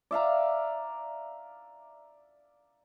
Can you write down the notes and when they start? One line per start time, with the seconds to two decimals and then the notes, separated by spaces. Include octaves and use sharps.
0.11 D5 E5 F5 A#5